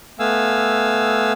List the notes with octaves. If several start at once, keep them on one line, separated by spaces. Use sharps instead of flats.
A3 B3 F5 G#5 E6